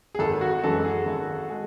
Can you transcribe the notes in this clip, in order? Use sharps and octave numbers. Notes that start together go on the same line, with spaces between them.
G#4
G#1 A4
F#4
F#2 E3 G#3 A4
G#4
G#1
G#3